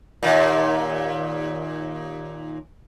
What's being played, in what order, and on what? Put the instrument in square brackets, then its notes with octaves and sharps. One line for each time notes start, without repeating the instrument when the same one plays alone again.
[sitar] D#2 A#2